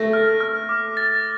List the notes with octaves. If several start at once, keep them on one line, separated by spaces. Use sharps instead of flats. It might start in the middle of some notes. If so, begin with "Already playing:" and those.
Already playing: A3 A#6
F6
F6
D6
A6